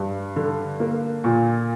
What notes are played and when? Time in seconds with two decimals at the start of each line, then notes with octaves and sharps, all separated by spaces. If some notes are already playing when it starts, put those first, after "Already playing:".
Already playing: G2
0.36 D3
0.80 A#3
1.24 A#2